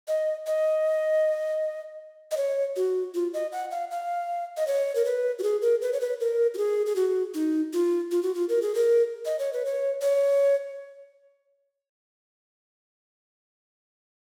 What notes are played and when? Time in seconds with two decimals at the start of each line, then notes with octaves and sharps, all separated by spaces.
0.08 D#5
0.47 D#5
2.31 D#5
2.37 C#5
2.76 F#4
3.14 F4
3.34 D#5
3.52 F#5
3.71 F5
3.91 F5
4.57 D#5
4.67 C#5
4.95 A#4
5.05 B4
5.39 F#4
5.43 G#4
5.62 A#4
5.82 B4
5.93 C#5
6.01 B4
6.20 A#4
6.54 F#4
6.58 G#4
6.86 G#4
6.96 F#4
7.34 D#4
7.73 F4
8.11 F4
8.23 F#4
8.35 F4
8.49 A#4
8.62 G#4
8.75 A#4
9.25 D#5
9.39 C#5
9.53 B4
9.65 C#5
10.02 C#5